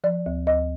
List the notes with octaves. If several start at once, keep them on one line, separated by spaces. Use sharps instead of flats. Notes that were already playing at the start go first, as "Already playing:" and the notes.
F3 D5
D2
D2 D#5